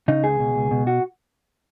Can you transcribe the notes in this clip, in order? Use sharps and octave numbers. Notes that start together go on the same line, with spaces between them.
C#3 D#4
C#2 G#4
B2
C#2
B2
F#4